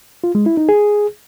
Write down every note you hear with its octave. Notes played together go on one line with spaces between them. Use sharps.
F4
G#3
E4
D#4
G#4